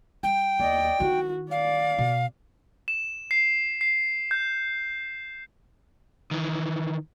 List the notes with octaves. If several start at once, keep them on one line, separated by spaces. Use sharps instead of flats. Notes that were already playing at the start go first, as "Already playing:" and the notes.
G3 G5
D#2 D5 D#5
D#3 E4 F#4
D5 F5
B2
E7
C7
C7
G6
D#3 E3